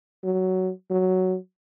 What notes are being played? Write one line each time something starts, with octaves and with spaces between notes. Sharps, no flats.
F#3
F#3